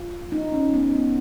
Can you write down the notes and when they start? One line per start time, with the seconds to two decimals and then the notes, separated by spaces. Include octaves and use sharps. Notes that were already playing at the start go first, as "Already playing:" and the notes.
Already playing: F4
0.32 D#4
0.52 C#4
0.74 B3
0.94 B3